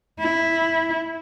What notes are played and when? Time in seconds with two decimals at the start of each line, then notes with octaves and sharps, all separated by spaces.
0.20 E4